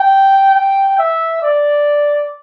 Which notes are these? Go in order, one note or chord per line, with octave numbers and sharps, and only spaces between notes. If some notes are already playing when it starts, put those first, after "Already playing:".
Already playing: G5
G5
E5
D5